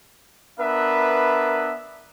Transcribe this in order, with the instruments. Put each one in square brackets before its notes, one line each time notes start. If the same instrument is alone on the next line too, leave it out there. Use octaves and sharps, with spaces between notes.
[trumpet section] B3 D4 A#4 B4 E5